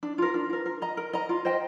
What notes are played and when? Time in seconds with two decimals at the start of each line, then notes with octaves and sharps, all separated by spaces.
0.03 D4
0.18 F4 A#4
0.34 D4
0.50 F4 A#4
0.66 A#4
0.82 D#5 A#5
0.97 A#4
1.13 D#5 A#5
1.29 F4
1.45 C5 D#5 G5